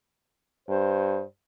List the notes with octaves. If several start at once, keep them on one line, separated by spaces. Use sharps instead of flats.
G2 C5